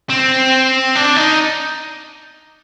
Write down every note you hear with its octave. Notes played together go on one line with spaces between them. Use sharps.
C4
D4
D#4